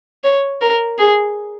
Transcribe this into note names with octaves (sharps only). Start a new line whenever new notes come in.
C#5
A#4
G#4